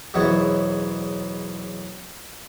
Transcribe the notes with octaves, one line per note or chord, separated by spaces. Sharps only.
B1 E2 G#2 E3 E4 C#5